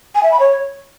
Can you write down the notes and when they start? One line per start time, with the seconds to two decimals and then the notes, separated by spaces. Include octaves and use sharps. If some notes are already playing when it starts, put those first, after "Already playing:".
0.15 G#5
0.23 E5
0.32 B5
0.40 C#5